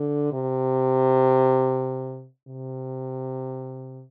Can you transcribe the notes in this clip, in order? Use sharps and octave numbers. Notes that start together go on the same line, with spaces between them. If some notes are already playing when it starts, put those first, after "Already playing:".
Already playing: D3
C3
C3